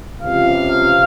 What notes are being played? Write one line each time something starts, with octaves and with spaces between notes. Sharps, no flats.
C#2 C3 F3 F5